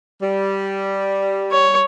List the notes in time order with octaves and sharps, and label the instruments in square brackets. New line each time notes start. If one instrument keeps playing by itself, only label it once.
[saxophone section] G3
[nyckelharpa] C#5